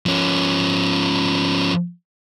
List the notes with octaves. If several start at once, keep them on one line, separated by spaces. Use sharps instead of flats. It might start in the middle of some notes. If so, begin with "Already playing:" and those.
F3 C#4